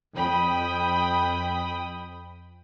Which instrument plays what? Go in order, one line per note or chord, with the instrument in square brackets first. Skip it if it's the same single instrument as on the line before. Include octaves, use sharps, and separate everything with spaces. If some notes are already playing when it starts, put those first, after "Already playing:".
[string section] F2 G5 B5 D#6